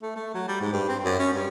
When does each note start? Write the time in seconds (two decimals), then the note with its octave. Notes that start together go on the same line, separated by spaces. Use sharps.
0.02 A3
0.16 A3
0.34 F#3
0.48 G3
0.61 G#2
0.72 G2
0.88 C4
1.03 F#2
1.19 C#4
1.33 G2